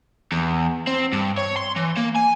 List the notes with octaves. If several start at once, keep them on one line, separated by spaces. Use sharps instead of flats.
E2
C4
G2
C#5
C6
E3
A#3
G#5